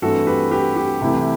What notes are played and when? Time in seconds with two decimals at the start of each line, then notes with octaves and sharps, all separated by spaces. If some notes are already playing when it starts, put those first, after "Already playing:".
0.02 G2 E3 A3 C4 F#4 A4
0.27 G4 B4
0.51 G4 B4
0.76 G4
1.01 C2 C3 E3 A3 E4